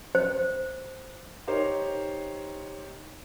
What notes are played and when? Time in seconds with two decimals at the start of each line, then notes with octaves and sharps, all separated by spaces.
0.15 C5
1.48 D#4 G4 A#4 C5 C#5